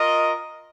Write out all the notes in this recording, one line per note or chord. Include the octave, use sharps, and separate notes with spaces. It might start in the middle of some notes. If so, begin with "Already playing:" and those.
Already playing: F4 A#4 D#5